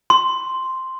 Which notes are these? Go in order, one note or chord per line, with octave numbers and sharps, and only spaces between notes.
C6